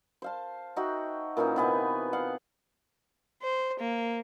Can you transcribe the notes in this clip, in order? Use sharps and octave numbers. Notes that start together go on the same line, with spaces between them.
C5 F5 A5
D#4 F#4 E5 G5
A#2 E3 C#4 D#4
C3 B3 G#5
F5 F#5
C5
A#3